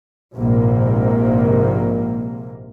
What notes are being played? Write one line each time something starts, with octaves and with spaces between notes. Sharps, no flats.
A#1 G#2 C3 A#3